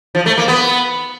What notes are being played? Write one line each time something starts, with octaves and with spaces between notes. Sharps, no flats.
F3
A3
A#3
B3